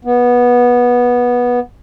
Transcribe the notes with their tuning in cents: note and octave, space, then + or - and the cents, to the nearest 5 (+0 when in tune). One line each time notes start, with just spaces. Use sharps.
B3 -15